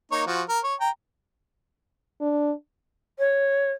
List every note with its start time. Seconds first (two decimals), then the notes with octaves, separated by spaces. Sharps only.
0.12 A#3 D#4 C#5
0.26 F3 F#4
0.49 A#4
0.63 C#5
0.80 G5 A#5
2.21 D4
3.19 C#5